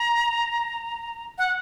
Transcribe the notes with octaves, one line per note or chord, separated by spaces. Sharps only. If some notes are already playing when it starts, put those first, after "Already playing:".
Already playing: A#5
F#5